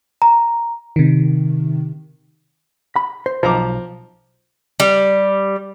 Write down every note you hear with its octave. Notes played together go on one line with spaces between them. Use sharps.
A#5
C3 D#3
B5
C5
B1 F3 A#5 D6
G3